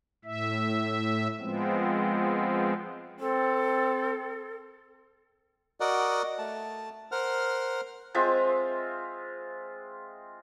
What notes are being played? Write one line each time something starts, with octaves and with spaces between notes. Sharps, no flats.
A2 E5
F3 G#3 B3 C4
C4 A4
F#4 A#4 D5 D#5 F#5
A3 A5
A#4 C5 F#5 F6
G#3 C4 F4 E5